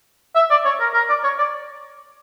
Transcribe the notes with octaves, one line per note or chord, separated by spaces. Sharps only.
E5
D5
C#5
A#4
A#4
D5
C#5
D5